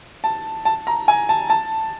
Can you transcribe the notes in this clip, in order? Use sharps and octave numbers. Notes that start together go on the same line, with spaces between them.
A5
A5
A#5
G#5
A5
A5